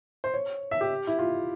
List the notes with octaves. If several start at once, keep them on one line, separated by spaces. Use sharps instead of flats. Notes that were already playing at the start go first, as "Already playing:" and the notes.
C5
C#5
E5
G4
E4
F4